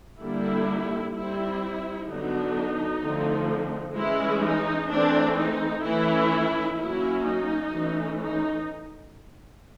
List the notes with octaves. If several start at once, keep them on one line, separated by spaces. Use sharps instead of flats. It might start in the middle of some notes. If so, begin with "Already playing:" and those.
D3 G3 A#3 D4 E4
G3 C4 E4
D3 F#3 B3 D4 D#4
D3 F3 A3 C4
E3 G#3 C#4 E4
D#4
E3 A3 C4 D4
D#4
E3 A3 C#4 E4
F#3 A#3 C#4 E4
D#4
E3 A3 C#4
D#4